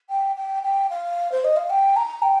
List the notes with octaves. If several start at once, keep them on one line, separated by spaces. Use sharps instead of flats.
G5
G5
G5
F5
C5
D#5
F5
G5
A#5
G5